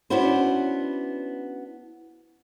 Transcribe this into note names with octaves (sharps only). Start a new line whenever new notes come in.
B3 C#4 D4 E4 F#4 C5